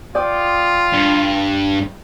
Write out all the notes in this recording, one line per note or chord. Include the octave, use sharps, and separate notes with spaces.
F4 D5 G5 D#6
G2